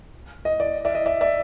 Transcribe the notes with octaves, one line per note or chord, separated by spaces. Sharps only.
D#5
D5
D5 E5
D#5
D5 E5
D5 E5